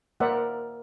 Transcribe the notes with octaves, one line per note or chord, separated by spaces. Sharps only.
A#3 A#4 C5 D5 E5 F#5